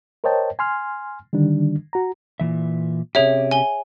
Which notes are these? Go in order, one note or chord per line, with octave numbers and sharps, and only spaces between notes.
A#4 C5 C#5 D#5 G5 A5
G#5 C6 F6
D3 D#3 G3 D4
F#4 A#5
A#2 E3 E5
C3 C#4 G4 G#4 C#5 E5
G#5 G7